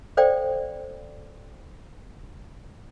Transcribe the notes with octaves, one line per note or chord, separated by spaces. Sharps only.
A4 C5 D5 F5 G5